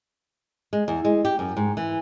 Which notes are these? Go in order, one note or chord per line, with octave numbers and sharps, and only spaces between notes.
G#3
E2
G#3
G4
F#2
G#2
E3